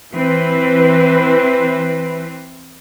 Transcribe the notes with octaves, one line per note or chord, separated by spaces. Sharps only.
E3 C4 B4